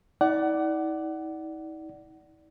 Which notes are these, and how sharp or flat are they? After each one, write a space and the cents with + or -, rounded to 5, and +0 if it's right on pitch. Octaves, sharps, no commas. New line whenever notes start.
D#4 +45 D5 +0 F#5 +25